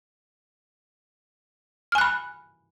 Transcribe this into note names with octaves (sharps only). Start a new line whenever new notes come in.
G#5 B5 F6 F#6